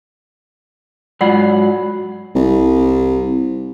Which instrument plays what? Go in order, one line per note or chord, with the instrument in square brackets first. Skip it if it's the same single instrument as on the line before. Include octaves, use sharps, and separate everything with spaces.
[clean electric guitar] G#2 F#3 B5 [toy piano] F4 D5 F#5
[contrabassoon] C2